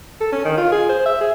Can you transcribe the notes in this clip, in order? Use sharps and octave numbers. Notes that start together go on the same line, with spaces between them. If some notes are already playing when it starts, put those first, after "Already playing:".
A4
C#4
D#3
F4
G#4
C5
E5
G#4